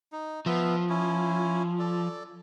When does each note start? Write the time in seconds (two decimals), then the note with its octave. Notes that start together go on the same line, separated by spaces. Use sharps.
0.12 D#4
0.46 F3 B3 E5
0.89 C#4 E4
1.79 A4 D5